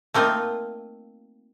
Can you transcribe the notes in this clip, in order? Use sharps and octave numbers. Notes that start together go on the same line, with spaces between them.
A3 A#3 C4 D#4 F4